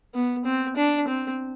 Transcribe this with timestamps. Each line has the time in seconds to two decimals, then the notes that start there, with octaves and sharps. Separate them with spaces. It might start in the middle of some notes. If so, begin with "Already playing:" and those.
0.15 B3
0.45 C4
0.77 D4
1.08 C4